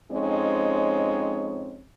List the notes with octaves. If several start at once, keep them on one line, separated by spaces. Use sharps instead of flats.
F2 G#3 C4 C#4 D#4 C#5